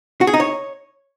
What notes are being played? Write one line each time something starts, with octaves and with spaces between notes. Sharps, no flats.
F#4
G#4
D#4
C#5